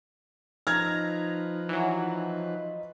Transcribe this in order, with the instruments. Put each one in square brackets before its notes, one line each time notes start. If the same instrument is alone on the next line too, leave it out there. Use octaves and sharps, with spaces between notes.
[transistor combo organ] F3 B4 [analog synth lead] D#4 [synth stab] A#5 [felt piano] F6 G#6
[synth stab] E3 F#3